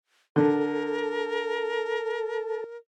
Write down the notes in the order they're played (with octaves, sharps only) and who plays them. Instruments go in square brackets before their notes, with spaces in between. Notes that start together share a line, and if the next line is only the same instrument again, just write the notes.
[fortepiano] D3 [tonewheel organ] A4 [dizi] A#4